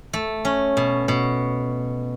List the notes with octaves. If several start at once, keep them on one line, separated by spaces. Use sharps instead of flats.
A3
C#4
B2
B2